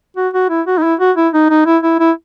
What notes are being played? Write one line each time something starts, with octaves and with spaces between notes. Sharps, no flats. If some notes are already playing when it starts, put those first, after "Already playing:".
F#4
F#4
E4
F#4
D#4
E4
F#4
E4
D#4
D#4
E4
E4
E4